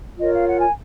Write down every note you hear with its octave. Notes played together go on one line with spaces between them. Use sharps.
F4 A#4 C#5 D#5
F5
F#5
G#5